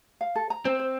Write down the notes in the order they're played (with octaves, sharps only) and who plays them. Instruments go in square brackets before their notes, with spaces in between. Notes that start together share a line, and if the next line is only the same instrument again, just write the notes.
[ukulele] F5
A4
A#5
[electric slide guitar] C4 [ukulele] C5
[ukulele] C5